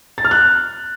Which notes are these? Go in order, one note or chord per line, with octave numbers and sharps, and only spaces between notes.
A6
F6
F#6